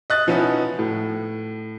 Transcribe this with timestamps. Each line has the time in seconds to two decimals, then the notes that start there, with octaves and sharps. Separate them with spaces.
0.10 D#5 F#6 A6
0.27 B2 F3 B3 C#4 D#4 E4
0.79 A2